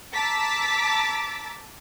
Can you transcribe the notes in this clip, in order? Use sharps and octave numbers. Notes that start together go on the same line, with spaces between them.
A5 A#5 D6 E6 A6 B6